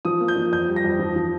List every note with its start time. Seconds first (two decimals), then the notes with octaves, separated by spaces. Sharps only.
0.05 F3 D#6
0.21 A#3
0.28 G6
0.36 F3
0.52 F2 G6
0.68 G3
0.76 A#6
0.85 F2
0.99 F3
1.16 F3